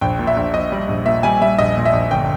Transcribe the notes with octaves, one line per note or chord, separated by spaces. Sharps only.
A#1 G5
A#2
E5
A#1
A#1 D#5
G3
A#1
A#2 E5
G3 G#5
G3 E5
A#1 D#5
A#2
E5
A#1
G1 G5